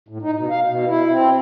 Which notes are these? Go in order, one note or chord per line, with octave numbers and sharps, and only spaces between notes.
A2
D#4
B2
F5
B2
E4
C4